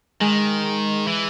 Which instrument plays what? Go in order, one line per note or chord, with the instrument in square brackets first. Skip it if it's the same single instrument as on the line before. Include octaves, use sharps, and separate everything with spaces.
[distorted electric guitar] D#3 [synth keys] G#3
[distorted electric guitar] E3